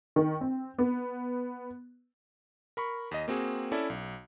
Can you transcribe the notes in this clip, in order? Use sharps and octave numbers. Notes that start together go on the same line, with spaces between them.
D#3
C4
B3
A#4 B5 C#6
D#2 D#5
A#3 C4 F#4 G#4
C#4 E4 A4 D5 E5
B1